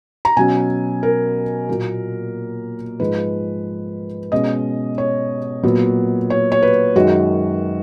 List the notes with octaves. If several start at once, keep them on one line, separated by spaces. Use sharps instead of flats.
A#5
B2 F#3 C#4 G#5
A#4
A#2 F#3 A#3
G#2 F3 G#3 B4
B2 G#3 C#4 D#5
C#5
A#2 F#3 B3
C#5
C#5
B4
F#2 D#3 G#3 F#4